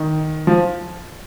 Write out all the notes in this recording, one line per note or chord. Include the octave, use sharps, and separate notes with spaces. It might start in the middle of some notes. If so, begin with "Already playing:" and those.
Already playing: D#3
F3